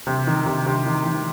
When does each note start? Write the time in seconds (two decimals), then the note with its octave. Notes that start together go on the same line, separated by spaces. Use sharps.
0.07 C3
0.27 D#3
0.46 C3
0.66 C3
0.86 D#3
1.06 D#3